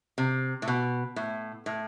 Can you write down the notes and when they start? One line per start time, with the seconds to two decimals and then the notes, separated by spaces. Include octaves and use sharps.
0.18 C3
0.62 A2
0.68 B2
1.16 A2
1.66 A2